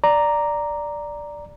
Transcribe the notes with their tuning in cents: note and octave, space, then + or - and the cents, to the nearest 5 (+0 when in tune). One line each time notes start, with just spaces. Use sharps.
D5 +0 A#5 +0